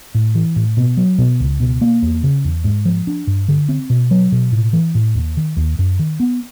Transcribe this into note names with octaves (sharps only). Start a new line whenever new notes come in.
A2
E3
A2
B2
F#3
B2
C#2
B2
A#3
E2
C#3
E2
G#2
F3
D4
G2
D3
C4
B2
F#3
B2
A2
E3
A2
D#2
D#3
D#2
F#2
D#3
B3